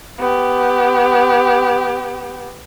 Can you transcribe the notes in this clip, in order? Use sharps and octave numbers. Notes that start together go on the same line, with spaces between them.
B3 G4